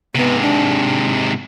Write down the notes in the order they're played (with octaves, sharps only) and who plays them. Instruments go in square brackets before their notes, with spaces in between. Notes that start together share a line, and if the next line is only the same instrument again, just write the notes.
[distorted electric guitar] G#2 C3 [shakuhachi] B3
[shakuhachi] D4